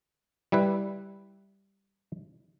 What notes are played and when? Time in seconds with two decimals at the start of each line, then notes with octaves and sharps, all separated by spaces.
0.52 G3 E4 B4